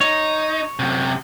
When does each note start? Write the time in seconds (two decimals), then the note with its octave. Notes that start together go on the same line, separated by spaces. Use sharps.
0.01 D#4 C#5
0.79 F#2 C3